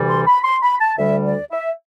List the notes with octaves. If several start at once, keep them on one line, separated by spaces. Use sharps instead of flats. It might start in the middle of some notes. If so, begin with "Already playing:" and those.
Already playing: D2 C3 E3 G3
C6
B5
C6
B5
A5
D2 D3 G3 E5
D5
E5